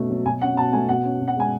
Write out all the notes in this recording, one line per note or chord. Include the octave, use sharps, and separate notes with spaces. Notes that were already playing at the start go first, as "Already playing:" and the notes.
Already playing: B2 A3 C#4
F#3
B2 G#5
C#4 F#5
B2 A5
A3 G#5
B2 F#5
C#4
B2
F#5
G#3 G#5